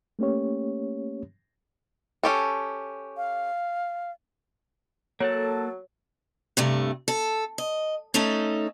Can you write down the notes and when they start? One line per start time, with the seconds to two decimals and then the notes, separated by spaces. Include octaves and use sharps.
0.19 A3 A#3 C#4 G4 C#5
2.23 C#4 G4 A4
3.17 F5
5.20 F#3 A#3 A4 C#5 F#5 A5
6.57 G2 C3 A3
7.08 A4
7.58 D#5
8.14 A3 C#4 D#4 A4